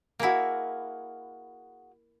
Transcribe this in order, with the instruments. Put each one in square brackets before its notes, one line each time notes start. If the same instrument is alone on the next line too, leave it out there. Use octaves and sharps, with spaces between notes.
[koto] A#3 E4 [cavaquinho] F#4 G#4 F5